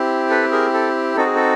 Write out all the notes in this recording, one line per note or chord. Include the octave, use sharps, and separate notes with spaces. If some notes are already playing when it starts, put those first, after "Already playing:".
Already playing: C4 E4 G4
A4 B4
G#4 A#4
A4
C4 D#4 F#4 A4
G#4
A4